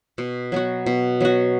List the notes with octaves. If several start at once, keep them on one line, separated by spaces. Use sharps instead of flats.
B2
F#3 B3 F#4
B2
F#3 B3 F#4